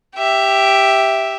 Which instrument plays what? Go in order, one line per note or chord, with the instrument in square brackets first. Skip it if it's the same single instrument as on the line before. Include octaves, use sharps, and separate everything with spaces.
[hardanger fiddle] G4 E5